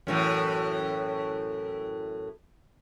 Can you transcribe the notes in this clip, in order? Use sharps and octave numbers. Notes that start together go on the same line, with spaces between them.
F#2 A2 E3